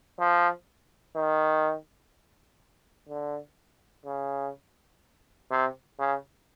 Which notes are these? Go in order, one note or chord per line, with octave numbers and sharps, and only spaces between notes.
F3
D#3
D3
C#3
C3
C#3